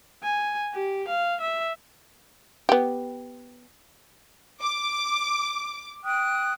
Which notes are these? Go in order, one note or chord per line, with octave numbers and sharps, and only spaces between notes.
G#5
G4
F5
E5
B3 G4
D6
G5 D#6 F#6